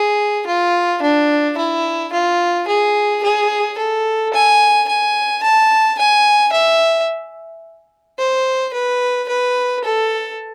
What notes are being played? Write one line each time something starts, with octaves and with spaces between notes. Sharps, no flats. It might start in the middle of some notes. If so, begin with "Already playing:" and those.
Already playing: G#4
F4
D4
E4
F4
G#4
G#4
A4
G#5
G#5
A5
G#5
E5
C5
B4
B4
A4